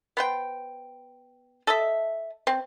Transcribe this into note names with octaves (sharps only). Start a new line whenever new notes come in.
B3 C5 G5
A4 D#5 E5
C4